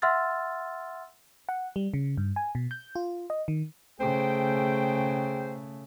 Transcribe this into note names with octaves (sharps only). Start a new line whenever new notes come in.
E5 F#5 C6 E6 F6 A6
F#5
G3
C#3
G2
G#5
B2
G6
F4
D#5
D#3
C#3 A3 G#4 C5 G5